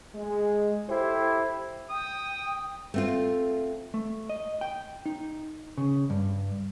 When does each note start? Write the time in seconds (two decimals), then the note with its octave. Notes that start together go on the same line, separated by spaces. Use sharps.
0.15 G#3
0.89 E4 G4 A4 C5
1.90 G5 D#6
2.94 A3 C4 F4
3.94 A3
4.29 D#5
4.61 G5
5.06 D#4
5.78 C#3
6.10 G2